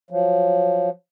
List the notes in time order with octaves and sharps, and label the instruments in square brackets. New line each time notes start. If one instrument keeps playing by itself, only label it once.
[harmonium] F3 F#3